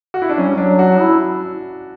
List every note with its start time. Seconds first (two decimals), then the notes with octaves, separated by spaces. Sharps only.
0.14 F#4
0.22 E4
0.29 D4
0.38 F#3 C#4
0.47 G3
0.55 F#3 D4
0.79 F#4
0.99 E4